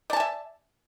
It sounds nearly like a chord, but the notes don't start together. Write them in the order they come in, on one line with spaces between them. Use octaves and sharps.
D5 A5 G#5 E5